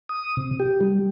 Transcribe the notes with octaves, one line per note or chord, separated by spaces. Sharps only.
D#6
C3
G4
G3